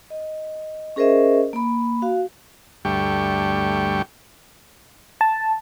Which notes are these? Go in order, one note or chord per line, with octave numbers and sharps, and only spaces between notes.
D#5
C#4 G#4 A#4 C5 D#5 E5
A#3 B5
F#4 F5
D2 G2 G3 A3 G5 C#6
A5